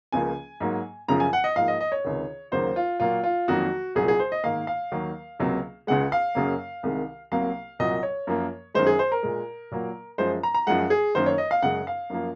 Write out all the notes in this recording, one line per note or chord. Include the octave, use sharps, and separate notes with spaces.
C#2 C#3 F3 A#3 G#5
G#2 F#3 A#3
F#2 C#3 F3 A#5
G#5
F#5
D#5
G#2 F3 A#3 F5
D#5
D#5
C#5
C#2 C3 D#3
D#2 C#3 F#3 A#3 C5
F4
A#2 F#3 A#3 F4
F4
F2 D#3 F#3 A#3 F#4
C2 A#2 F#3 G#4
G#4
C5
D#5
G#2 D#3 A#3 F5
F5
D#2 D#3 F#3 A#3
C#2 C3 F#3 A#3
C#2 C#3 G#3 F#5
F5
F#2 C#3 F#3 A#3
C2 C3 D#3 G#3
C2 C3 F#3 A#3 F5
C2 A#2 F#3 D#5
C#5
F#2 F3 A#3
F#2 D#3 G#3 C5
G#4
C5
A#4
A#2 G#3
A#2 F#3 A#3
F#2 F3 G#3 C5
A#5
A#5
F#2 F3 G#3 F#5
G#4
F#2 D#3 A#3 C5
C#5
D#5
F5
F#2 C#3 G#3 F#5
F5
F#2 F3 A#3